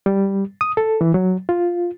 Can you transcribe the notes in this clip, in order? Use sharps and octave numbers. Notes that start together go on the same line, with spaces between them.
G3
D#6
A4
E3
F#3
F4